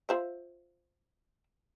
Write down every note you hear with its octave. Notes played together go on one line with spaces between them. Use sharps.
F4 C5 E5